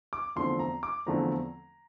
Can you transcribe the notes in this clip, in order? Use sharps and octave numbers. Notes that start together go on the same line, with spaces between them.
D6
E2 D3 F3 A3 C4 C6
A#5
D6
E2 D3 F3 A3 C4 A#5